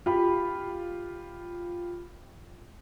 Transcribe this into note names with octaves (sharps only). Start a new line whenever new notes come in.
F4 G4 B5